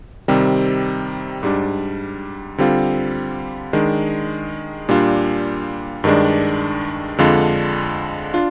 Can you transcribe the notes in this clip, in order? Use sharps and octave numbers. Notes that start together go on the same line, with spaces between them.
C3 D#3 G3 C4
G#2 G3 D4
D3 G3 C4 F4
D#3 G#3 D4
A#2 G3 D4 F4
G2 D#3 G#3 D4
F2 D3 G#3 D4 F4
D4 F4